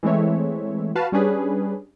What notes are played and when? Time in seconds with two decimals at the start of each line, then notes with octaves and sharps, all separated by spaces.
0.03 E3 G#3 A3 C4 C#5 E5
0.95 F#4 B4 F5 A5
1.12 G3 C#4 D4 G#4 B4